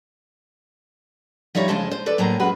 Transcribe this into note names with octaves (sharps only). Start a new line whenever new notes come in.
F3 G3 D#4 E4 C#5
F2 C#3 F3 G#3 C5 A5
C5
A4 B4 D5
A2 F#3 A#3 G#4 C5 A#5
F#2 G#3 F#4 B4